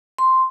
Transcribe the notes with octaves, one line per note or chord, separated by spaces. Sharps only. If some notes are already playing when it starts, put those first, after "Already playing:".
C6